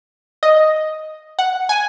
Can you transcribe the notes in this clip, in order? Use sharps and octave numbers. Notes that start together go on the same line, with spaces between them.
D#5
F#5
G#5